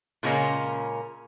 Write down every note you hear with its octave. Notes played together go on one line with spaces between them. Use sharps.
A#2 C#3 G#3 A#3 C#4